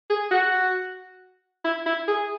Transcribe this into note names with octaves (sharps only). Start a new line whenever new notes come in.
G#4
F#4
E4
E4
G#4